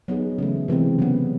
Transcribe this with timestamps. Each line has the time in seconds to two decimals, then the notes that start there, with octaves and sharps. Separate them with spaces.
0.08 F#3 B3 D#4 G#4
0.38 C#3 E3 A3
0.68 C3 E3 G#3 C4
0.99 C#3 F#3 B3